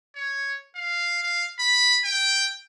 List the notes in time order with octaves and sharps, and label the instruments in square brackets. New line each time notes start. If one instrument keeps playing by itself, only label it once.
[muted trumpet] C#5
F5
F5
B5
G5